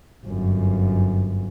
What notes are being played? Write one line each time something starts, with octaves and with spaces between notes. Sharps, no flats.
G1 F#2